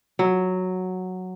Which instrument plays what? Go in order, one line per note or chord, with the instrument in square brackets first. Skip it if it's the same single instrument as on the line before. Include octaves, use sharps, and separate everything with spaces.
[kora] F#3